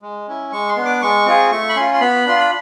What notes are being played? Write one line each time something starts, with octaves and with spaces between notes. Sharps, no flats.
G#3
C#4 E4
G#3 C#6
C6
B3 D4
D6
G#3 C#6
C4 F4 G#4
A3 C#6
B5
C#4 F4 C6
C6
B3 B5
D4 F4 C6
B5